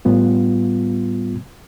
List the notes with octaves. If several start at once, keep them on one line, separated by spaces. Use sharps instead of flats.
A2 G3 B3 F4